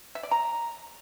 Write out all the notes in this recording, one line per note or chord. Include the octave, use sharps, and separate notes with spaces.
E5
D5
A#5